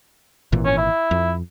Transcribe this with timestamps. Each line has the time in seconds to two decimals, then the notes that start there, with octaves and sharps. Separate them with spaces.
0.52 G#1 A#2 E3
0.65 C#4
0.78 E4
1.11 F2